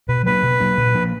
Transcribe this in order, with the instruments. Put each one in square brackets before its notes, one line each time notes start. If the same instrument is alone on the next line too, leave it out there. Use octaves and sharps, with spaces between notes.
[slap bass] B2 [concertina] B4
[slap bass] F#3 A#3 D4 [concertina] B4
[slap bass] B2
F#3 A#3 D4
A#2
F3 A#3 D4